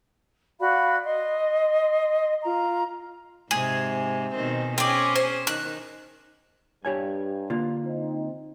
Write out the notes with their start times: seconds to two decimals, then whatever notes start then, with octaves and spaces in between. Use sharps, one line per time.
0.60 F#4 D5 F5 B5
1.05 D#5 C6
2.43 F4 A#5
3.51 G#2 C3 G#4
4.35 B2 D#3 C4
4.78 C4 C#4 G#4 D5
5.16 C5
5.47 D#3 F#6
6.85 G2 G4 C#5 G#5
7.50 D3 A#3 F4
7.85 C4 D#4